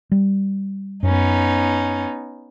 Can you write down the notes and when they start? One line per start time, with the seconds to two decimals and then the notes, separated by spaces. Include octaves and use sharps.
0.12 G3
1.03 F#2 B3 C#4 D#4